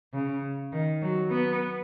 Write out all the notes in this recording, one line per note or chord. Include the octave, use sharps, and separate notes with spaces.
C#3
D#3
F#3
B3